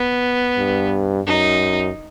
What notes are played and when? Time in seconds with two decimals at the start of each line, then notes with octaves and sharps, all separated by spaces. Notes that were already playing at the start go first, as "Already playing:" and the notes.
Already playing: B3
0.58 G2
1.27 F#2 D#4